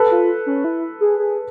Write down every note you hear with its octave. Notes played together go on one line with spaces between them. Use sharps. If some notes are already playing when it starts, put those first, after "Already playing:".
Already playing: A4 B4
F4
C#4
E4
G#4
G#4